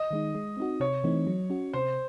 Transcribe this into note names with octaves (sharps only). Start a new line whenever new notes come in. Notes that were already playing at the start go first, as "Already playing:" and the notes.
Already playing: D#5
D#3 G#3 D#4
G#3
C4 D#4 F#4
C3 C#5
E3 A3 C4 D#4
F#3
C#4 F#4
C3 C5